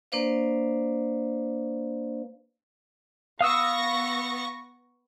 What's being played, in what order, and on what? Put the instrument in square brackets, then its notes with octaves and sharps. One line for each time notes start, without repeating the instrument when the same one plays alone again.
[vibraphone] A#3 D4 B4 C5 D5 F5
[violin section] B3 C#6 A#6 [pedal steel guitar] F5 D#6 E6